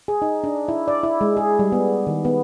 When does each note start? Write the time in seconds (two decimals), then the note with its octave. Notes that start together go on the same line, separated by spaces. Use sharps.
0.08 G#4
0.22 D#4
0.44 D4
0.69 E4
0.88 D5
1.03 E4
1.21 G#3
1.37 G#4
1.59 G3
1.72 B3
2.07 D#3
2.25 B3